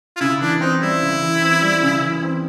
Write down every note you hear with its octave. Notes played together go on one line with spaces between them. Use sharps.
F4
C#3 E4
E3 D4
C4 D#4
G3 E4
C#3
E3
C4
G3
C#3
E3
C4